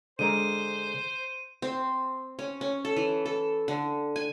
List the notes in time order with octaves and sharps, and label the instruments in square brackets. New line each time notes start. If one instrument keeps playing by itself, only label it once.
[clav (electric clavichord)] D3 G#3 A#4 [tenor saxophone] C5 [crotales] D#7
[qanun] C4
C#4
C#4
A4
E3
A4
D3
G#5